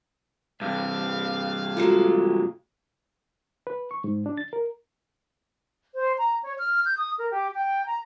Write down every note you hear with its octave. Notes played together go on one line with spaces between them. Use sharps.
G2 C3 F5
F#3 G#3 A3 F4
B4
C#6
G#2
D4
A6
A#4
C5
A#5
C#5
F6
G6
D#6
A#4
G4
G5
A#5